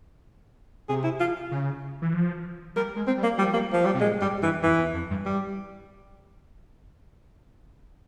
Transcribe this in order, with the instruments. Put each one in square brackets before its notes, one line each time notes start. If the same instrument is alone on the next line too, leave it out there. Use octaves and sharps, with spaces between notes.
[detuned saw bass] C3 [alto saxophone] G#4
[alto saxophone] E4
F4
[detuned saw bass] C#3
E3
F3
[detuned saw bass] G3 [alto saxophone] A#4
[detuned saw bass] G#3
[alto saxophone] C4
[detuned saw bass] G3
[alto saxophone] A#3
[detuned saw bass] F3 [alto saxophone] G3
[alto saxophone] A#3
F3
G3
[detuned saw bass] C3
[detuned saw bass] A#2 [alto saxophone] G#3
[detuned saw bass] G2 [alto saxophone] G3
[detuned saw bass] G2 [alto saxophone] E3
[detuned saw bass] F2 [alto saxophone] E3
[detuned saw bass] E2
F2
G2
[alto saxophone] G3